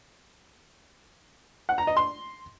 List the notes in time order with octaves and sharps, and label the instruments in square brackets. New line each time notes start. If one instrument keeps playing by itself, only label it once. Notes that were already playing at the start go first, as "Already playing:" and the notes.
[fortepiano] F#5
A#5
D#5
C6